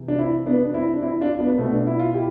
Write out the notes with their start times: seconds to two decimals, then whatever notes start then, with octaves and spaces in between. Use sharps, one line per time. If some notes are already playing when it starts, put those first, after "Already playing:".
Already playing: C3 E3
0.08 D4
0.19 C4 E4
0.46 B3 D4
0.65 D4
0.74 C4 E4
0.94 D4
1.02 C4 E4
1.21 D4 F4
1.39 B3 D4
1.50 B3
1.58 B2 A3 C4
1.72 D4
1.87 E4
1.99 F4
2.14 E4 G4